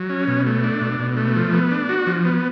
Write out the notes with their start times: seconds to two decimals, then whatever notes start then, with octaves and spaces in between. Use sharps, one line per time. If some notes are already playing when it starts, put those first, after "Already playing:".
Already playing: F#3
0.09 C#4
0.28 B2
0.46 A3
0.64 D4
0.81 B2
0.99 B2
1.17 A3
1.36 F3
1.53 B3
1.71 D4
1.89 F#4
2.07 F3
2.25 B3